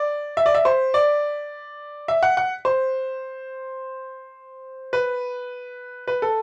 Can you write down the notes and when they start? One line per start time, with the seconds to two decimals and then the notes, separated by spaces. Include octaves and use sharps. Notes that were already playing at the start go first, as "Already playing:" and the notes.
Already playing: D5
0.37 E5
0.46 D5
0.55 E5
0.65 C5
0.94 D5
2.08 E5
2.23 F#5
2.37 F#5
2.65 C5
4.93 B4
6.07 B4
6.22 A4